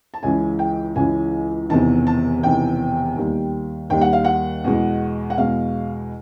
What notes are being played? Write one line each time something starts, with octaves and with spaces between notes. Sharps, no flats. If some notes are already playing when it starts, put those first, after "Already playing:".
A5
C#2 C#3 E3 G#3 G#5
G5
C#2 C#3 E3 G#3 G#5
E1 E2 C3 D#3 A5
A5
E1 E2 C3 D#3 G5
D#2 D#3 G3
D#2 D#3 G3 G5
F#5
F5
F#5
E2 B2 G#3
F#5
E2 B2 G#3 F5